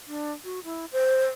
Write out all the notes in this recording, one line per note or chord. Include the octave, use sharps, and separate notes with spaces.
D4
F#4
E4
C5